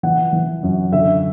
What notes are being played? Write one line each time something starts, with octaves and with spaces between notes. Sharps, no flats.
E3 F#5
E3
F#2
D3 E5